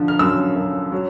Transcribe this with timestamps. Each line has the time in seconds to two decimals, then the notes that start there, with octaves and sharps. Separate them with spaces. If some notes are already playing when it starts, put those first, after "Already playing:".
Already playing: D3 F3
0.08 F6
0.19 F#2 E6
0.55 F#2
0.92 F#3